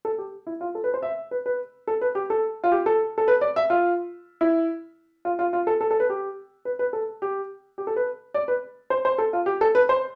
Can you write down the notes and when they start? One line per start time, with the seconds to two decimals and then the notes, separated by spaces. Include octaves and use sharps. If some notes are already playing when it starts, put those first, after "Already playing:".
0.05 A4
0.18 G4
0.47 E4
0.61 F4
0.75 A4
0.84 B4
0.94 C5
1.03 E5
1.31 B4
1.46 B4
1.87 A4
2.01 B4
2.15 G4
2.30 A4
2.64 F4
2.72 G4
2.86 A4
3.18 A4
3.28 B4
3.41 D5
3.56 E5
3.70 F4
4.41 E4
5.25 F4
5.39 F4
5.53 F4
5.67 A4
5.81 A4
5.91 A4
6.00 B4
6.10 G4
6.65 B4
6.79 B4
6.93 A4
7.22 G4
7.78 G4
7.87 A4
7.96 B4
8.34 D5
8.48 B4
8.90 C5
9.05 C5
9.18 A4
9.33 F4
9.46 G4
9.61 A4
9.75 B4
9.89 C5